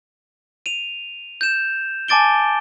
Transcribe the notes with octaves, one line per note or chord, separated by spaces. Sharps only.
D#7 F7
G6 E7
G#5 A5 D6 A6 D7 G7